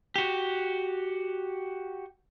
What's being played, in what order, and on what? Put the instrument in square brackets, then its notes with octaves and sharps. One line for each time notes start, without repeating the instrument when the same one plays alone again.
[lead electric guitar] F#4 G4